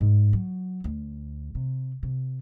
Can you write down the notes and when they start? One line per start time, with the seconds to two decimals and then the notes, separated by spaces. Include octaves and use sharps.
0.01 G#2
0.33 F#3
0.84 D2
1.55 C3
2.03 C3